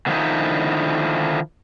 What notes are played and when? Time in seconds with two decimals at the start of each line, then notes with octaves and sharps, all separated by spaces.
0.06 D3 D#3 F3 F#3 D#4 E4